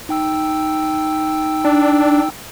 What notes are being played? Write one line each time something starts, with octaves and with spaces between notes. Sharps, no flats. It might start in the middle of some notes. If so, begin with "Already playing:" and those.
D#4 G5 E6
D4